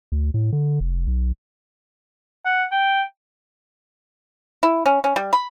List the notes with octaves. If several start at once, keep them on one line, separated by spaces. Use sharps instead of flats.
D2
A2
D3
F1
B1
F#5
G5
E4
C#4
C#4
G3
B5